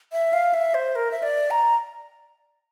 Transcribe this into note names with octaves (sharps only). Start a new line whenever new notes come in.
E5
F5
E5
C5
A#4
E5
D5
A#5